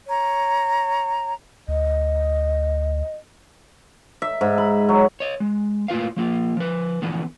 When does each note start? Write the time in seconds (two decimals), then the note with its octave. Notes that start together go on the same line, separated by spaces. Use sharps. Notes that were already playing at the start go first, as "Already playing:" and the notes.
0.08 C#5 A#5
1.68 D2 D#5
4.22 E5
4.41 G#2
4.58 B5
4.89 F#3
5.20 C#5 D#5
5.40 G#3
5.88 A2 A#3 F4 B4 F5
6.17 F3 A#3 F4
6.57 F3 B4
7.02 D3 E3 F3 B3